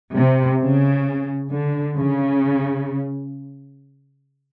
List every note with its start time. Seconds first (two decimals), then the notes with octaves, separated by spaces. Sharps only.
0.15 C3
0.61 C#3
1.52 D3
1.97 C#3